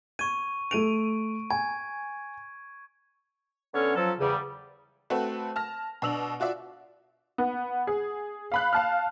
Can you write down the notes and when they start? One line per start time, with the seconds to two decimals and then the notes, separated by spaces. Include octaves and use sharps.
0.19 C#6 G#6 D#7
0.71 A3 D7 D#7 F7
1.50 G#5 G#6
3.74 D3 B3 C#4 A4 C#5 F6
3.96 F3 F#3 A4
4.20 E2 C#3 G3
5.10 A3 C4 F#4 A4 B4
5.56 A5 F6 A#6
6.02 B2 D4 E6 F7 F#7
6.40 F4 F#4 D5 E5
7.38 B3
7.87 G#4
8.52 F5 B5 F#6
8.73 F5 A5 F6